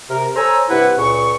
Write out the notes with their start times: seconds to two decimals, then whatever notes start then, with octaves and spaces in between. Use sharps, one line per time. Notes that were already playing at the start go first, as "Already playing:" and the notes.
0.09 C3 A#4
0.36 A4 C5 C#5 G#5 A#5 E6
0.70 G2 C3 E4 B4 F#5
0.98 C#2 A#2 C#6